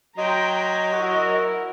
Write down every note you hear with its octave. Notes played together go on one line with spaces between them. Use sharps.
F#3 D#5 G5 A#5 C6
E4 F#4 A#4